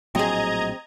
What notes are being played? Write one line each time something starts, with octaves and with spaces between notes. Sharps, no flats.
A#1 A2 F#3 C4 G#4 D#5 A#5 G#6